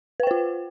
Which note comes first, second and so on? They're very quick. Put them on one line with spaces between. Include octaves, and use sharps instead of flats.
B4 G5 C5 F4